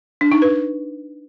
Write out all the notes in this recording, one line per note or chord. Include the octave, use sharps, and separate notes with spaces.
D4
D#4
B4